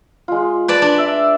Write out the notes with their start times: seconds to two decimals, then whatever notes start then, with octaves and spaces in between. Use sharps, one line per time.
0.28 G#3 F4
0.68 B4 D5 A5
0.82 D4
0.98 E5